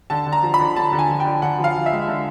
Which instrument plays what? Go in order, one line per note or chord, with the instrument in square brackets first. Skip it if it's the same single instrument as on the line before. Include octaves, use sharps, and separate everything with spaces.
[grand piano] D3 A5
D3
A#5
F3
B5
D3
D3 A5
D3
G#5
F3
G5
D3
D3 F#5
F3
F5
F3
E5
G#3
D3